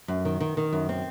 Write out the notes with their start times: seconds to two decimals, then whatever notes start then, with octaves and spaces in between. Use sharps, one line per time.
0.08 F#2
0.25 D#3
0.40 D#3
0.57 D#3
0.73 F#2
0.89 C4